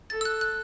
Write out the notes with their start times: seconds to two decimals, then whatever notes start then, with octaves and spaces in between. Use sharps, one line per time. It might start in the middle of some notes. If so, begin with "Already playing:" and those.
0.10 A4 A6
0.21 E6
0.25 F#6
0.41 F#6